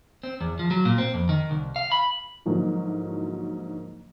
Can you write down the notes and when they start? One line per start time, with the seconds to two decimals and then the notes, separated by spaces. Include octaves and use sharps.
0.23 C4
0.41 E2
0.59 F3
0.71 F#3
0.85 A#2
0.98 C4
1.14 F2
1.29 D#3
1.51 C2
1.76 F5
1.92 B5
2.45 G#2 D3 F3 F#3 A#3 E4